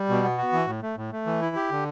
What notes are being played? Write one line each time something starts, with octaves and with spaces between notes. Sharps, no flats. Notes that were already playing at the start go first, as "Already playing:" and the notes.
Already playing: G3
B2
B3
F#4
E3
A2
A3
A2
A3
E3
E4
G4
D3